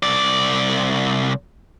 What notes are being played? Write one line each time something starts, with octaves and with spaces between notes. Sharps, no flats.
C2 D5